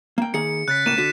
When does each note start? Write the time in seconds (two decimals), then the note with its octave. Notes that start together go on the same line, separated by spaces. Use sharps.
0.18 A#3 G5
0.34 D#3 A#3 G#4 C#7
0.68 C#3 F#6 A6 B6
0.86 A2 C#3 A#3 D#7 E7
0.98 D3 F#4 B6